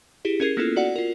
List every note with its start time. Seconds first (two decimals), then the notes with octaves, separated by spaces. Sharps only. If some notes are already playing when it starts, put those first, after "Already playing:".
0.25 E4 G4 G#4
0.40 C#4 G#4 A#4 G#6 C7
0.57 A#3 B3 C#4 E4 F4 A4
0.76 F#4 D5 F#5
0.96 F4 A#4